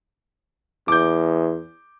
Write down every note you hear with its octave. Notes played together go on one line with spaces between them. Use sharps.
E2 D6 G6